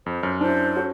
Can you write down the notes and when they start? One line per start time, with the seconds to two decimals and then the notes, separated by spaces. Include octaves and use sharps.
0.06 F2 C5
0.23 F#2 F6
0.41 D4 E4 C5
0.76 C#4 F#4 A4